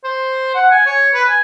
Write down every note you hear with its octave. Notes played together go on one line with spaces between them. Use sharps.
C5
F#5
G#5
C#5
B4
G#5